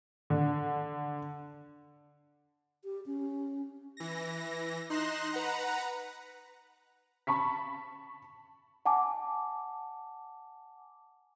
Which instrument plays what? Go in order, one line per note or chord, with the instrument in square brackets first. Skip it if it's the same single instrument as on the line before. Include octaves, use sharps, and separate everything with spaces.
[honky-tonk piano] D3
[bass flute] G4
C#4
[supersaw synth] E3 A#6
D#4 C6 F#6 A#6 E7
B4 F#5 A#5
[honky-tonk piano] A5 B5 C#6 B6
[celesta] F#5 G#5 A5 D6